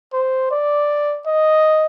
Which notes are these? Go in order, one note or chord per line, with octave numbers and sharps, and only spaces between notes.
C5
D5
D#5